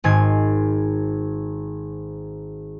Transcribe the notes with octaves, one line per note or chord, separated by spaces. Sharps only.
G#1 G#2 G#6 C7